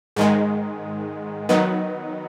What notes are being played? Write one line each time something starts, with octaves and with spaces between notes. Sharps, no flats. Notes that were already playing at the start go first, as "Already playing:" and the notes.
G#2 D#3 G#3
D#3 F#3 B3 D#4